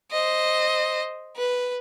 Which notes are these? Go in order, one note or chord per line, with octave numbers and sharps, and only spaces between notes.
C5 D#5
B4